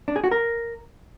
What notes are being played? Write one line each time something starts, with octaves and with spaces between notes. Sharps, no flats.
D4
G#4
F#4
A#4